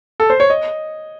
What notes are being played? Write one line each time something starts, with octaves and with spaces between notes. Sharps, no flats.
A4
C5
C#5
D#5